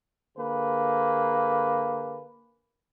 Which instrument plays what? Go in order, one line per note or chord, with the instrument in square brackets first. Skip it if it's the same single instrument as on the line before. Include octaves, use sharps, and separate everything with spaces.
[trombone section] D3 A#3 G#4 B4